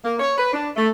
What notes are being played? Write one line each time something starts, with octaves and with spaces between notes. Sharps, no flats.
A#3
C#5
B4
D4
A3